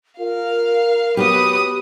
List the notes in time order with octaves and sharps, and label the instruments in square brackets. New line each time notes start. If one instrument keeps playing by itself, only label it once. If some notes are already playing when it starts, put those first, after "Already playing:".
[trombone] F4 [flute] A#4 [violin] F5
[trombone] F#3 [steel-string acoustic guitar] B3 F#4 G4 [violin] B4 D#6